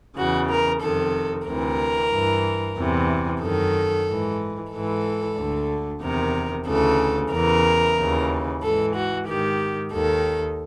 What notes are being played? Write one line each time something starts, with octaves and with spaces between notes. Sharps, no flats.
E2 C#3 E3 F#4
A#4
F2 C3 D#3 A4
D2 C3 E3 A#4
G2 E3
E2 C3 E3
F#2 D#3 A4
G#2 E3
G#2 E3 A4
D2 D3
E2 C3 D#3 A#4
D2 C#3 E3 A4
E2 C#3 E3 A#4
D#2 C#3 E3
G#2 E3 A4
F#4
G#2 D#3 G4
D#2 D#3 A4